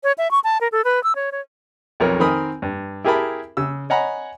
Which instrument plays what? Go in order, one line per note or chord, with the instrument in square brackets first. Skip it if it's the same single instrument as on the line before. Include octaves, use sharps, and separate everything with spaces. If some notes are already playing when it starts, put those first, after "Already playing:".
[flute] C#5
E5
C#6
A5
A#4
A4
B4
E6
C#5
C#5
[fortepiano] B1 F2 A#4 C#5
D#3 C4 A#4 G#5 B5 D#6
G2
E4 G4 G#4 A#4 A5 B5
C#3 E6
C#5 D#5 F#5 G#5 A#5 B5